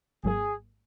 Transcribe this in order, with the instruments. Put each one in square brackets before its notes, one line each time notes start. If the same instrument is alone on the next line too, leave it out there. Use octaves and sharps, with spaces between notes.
[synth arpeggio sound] G#1 G#2 F#3 A#3 [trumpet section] G#4